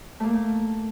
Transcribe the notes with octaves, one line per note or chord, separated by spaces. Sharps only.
A3 A#3